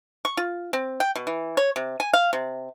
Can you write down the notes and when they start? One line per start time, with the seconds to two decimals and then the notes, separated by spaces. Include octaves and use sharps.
0.25 C#6
0.37 F4
0.73 C4
1.00 G5
1.16 B2
1.27 E3
1.57 C#5
1.76 C3
2.00 G#5
2.13 F5
2.33 C3